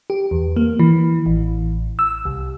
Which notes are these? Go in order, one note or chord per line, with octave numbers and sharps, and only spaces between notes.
G4
E2
A#3
E3
A1
E6
C2